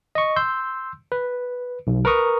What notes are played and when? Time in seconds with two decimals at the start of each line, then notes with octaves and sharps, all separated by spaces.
0.15 D#5 C#6
0.36 C6 E6 G6
1.12 B4
1.87 B1
2.05 A#4 B4 A#5 C#6 D#6